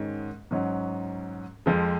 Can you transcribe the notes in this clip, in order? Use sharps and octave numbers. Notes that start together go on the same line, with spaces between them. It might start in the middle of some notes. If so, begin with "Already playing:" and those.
Already playing: G#2 D#3 G#3 C#4
G#2 F#3 C#4
F2 F3 G#3